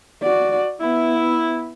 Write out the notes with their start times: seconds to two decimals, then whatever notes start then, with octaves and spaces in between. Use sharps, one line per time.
0.22 F#4 D5
0.81 B3 E4